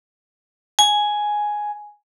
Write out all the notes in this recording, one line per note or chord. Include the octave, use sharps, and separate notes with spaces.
G#5